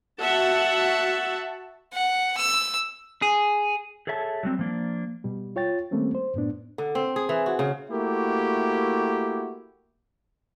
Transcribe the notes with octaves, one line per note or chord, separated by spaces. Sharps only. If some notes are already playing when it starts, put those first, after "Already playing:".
F#4 E5 F#5 A5
F#5
E6
G#4
G#4 A4 C#5 E5 G#5 A5
F#3 G3 C4
F3 A#3 D4
B2 G3
F4 C#5 G5 A6
D#3 G3 A3 A#3 C4 C#4
C5
F#2 A2 B3 D4
D3
C4
G#4
E3
F#4
C#3
A3 A#3 E4 F#4 G4